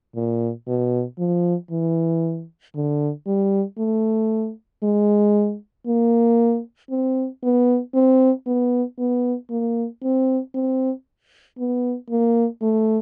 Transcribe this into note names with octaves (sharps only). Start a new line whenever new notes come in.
A#2
B2
F3
E3
D3
G3
A3
G#3
A#3
C4
B3
C4
B3
B3
A#3
C4
C4
B3
A#3
A3